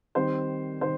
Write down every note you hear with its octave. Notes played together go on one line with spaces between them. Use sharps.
D#3 G3 C4 C5
D#3 C5